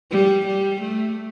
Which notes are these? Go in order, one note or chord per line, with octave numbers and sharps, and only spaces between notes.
G3
G3
A3